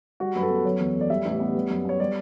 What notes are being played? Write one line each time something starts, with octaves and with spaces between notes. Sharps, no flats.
G3 F#4
F#2 B4
A4
B3
F#3 C#5
E2
A3
D5
G3 E5
A1
B3
G3
F#2
B3 C#5
G3 D5